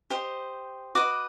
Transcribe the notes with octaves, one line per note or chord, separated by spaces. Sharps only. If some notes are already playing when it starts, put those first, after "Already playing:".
G4 C5 D#5
F#4 B4 D#5 D6